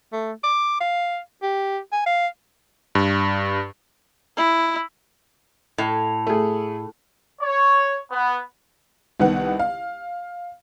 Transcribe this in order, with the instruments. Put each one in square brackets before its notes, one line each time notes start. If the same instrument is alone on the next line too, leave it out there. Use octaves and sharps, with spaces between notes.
[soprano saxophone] A3
D6
F5
G4
G#5
F5
[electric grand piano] G2
[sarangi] E4
[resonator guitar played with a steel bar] A2
[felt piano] A3 G#4
[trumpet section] C#5
B3
[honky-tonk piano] C2 D#3 B3 F#5
F5